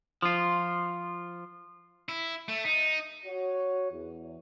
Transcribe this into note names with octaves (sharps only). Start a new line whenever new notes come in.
F3 F4
E4
A3
D#4
F#4 C#5
E2